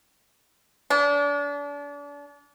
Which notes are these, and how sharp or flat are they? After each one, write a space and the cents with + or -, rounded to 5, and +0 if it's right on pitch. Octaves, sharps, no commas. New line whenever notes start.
D4 -35